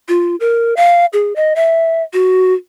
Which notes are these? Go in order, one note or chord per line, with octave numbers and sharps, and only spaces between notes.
F4
A#4
F5
G#4
D#5
E5
F#4